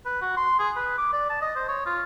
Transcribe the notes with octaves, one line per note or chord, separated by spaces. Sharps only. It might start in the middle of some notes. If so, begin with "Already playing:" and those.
B4
F#4
C6
G#4
B4
D6
D5
A5
D#5
C5
C#5
F4